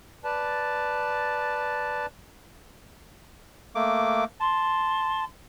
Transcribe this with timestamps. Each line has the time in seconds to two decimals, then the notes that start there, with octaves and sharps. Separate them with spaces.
0.24 B4 D5 A5
3.75 A3 A#3 D6
4.40 A5 C6